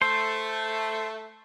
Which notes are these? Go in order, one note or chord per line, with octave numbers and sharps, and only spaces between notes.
A3 C5